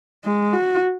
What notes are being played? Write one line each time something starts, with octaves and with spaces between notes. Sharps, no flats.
G#3
F#4